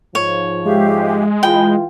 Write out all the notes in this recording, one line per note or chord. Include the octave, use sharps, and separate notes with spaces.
G#2 F3 C#5
G#3 G4 E5 F5
E3 F4 G5 B5